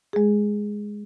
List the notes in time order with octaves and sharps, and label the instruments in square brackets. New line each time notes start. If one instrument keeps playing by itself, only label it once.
[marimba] G#3 G#4